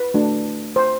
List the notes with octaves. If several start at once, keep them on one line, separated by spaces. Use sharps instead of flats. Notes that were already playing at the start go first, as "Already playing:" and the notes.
Already playing: B4
A3 D4 F#4
C5